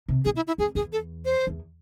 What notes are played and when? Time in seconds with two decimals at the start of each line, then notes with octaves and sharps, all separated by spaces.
0.08 C3
0.25 B2 G#4
0.36 E4
0.47 E4
0.58 F2 G#4
0.75 E2 G#4
0.92 A4
1.25 C5
1.47 E2